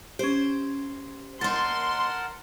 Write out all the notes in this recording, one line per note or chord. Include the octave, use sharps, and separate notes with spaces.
C#4 G4 C5
D#2 D#4 A#4 F#5 A5 C6 A6